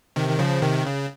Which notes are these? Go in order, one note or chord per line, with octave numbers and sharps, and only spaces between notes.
C3 D#3
D#3
C#3 F3
C3 D#3
C#3